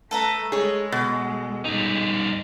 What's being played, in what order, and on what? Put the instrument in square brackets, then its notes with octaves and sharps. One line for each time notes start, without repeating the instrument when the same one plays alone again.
[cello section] A3 [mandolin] A4 B4 A#5
[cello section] G#3 [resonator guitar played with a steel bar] G#4 C#5
[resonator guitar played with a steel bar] B2
[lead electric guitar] G2 D#4